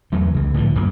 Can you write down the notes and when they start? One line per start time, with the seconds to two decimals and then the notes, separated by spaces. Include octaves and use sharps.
0.12 E2 F#3 A3
0.34 C#2 C#3
0.54 A2 D3 D#3 F3
0.75 A1 F#2 A2 A#3